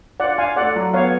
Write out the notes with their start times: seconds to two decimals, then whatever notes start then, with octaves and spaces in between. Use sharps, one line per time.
0.20 F4 D5 F#5
0.38 F4 F5 G#5
0.57 A3 D5 F#5
0.76 F#3
0.94 B3 C#5 F5